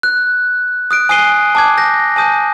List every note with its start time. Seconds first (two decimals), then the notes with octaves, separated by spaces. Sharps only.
0.03 F#6
0.91 D#6 F#6 D7
1.09 G#5 D#6 F#6 C7 D#7 G7
1.55 A5 D6 G#6
1.77 G6 A#6
2.16 G#5 A5 D#6 G6